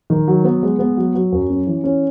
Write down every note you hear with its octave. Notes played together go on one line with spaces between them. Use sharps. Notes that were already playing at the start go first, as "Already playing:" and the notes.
D#3
F#3
B3
G#3
B3
F#3
F#3
F#2
C#4
E3
C#4